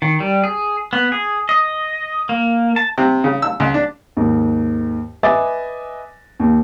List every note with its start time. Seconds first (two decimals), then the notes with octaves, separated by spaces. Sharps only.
0.02 D#3
0.20 G3
0.44 G#4
0.93 B3
1.12 G#4
1.49 D#5
2.29 A#3
2.76 A5
2.98 C3
3.24 C#3
3.42 E6
3.60 C#2
3.74 D4
4.17 D#2 G#2
5.23 B4 D#5 E5 G#5 D6 A6
6.40 D#2